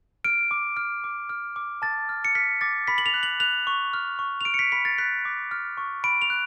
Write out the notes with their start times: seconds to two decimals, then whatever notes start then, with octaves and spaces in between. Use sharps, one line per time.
0.24 F6 D7
0.51 D6
0.77 F6
1.04 D6
1.29 F6
1.56 D6
1.82 A5 A6
2.09 F6
2.25 C#7
2.35 F6 B6
2.61 D6 A6
2.87 B5 B6
2.98 F#7
3.06 F7
3.14 F#6
3.23 F#7
3.40 F#6 F7
3.67 C#6
3.93 F6
4.19 C#6
4.41 F7
4.45 F6 D7
4.54 C#7
4.59 B6
4.72 B5 B6
4.85 A6
4.98 F#6 B6
5.25 D6
5.51 F6
5.77 C#6
6.04 B5 D7
6.22 F7
6.30 F#6